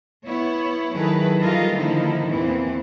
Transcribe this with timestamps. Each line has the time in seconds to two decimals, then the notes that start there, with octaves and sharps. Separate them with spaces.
0.25 B3 E4 C#5
0.94 D#3 F#3 E4 G#4 A4 B4
1.40 E3 G3 F4 A4 A#4 D#5
1.75 D3 D#3 F3 A#3 D#4 E4
2.30 E2 A#2 E3 C4